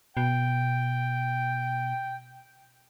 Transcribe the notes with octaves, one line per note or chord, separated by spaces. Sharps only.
B2 G5